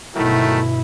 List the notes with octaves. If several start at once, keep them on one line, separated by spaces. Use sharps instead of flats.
G1 B2 D#3 F#3 A3 E4